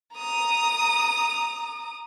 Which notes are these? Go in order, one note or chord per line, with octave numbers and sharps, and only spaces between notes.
A#5 D#6